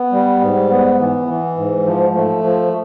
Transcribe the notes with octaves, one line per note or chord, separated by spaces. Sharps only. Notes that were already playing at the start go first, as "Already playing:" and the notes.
Already playing: B3
G3
G#2
B3
E3
E3
G#2
F3
A3
F3